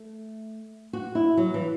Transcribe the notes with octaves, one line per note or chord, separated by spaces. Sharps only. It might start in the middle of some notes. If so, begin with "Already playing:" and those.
Already playing: A3
F#4
E4
F#3
E3